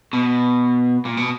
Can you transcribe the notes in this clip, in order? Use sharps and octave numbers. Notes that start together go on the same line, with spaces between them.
B2
A#2
B2